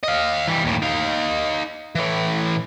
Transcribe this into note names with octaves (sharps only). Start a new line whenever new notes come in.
D#5 F5
E3 G3
D#2 A2
D#4 F5
A2 E3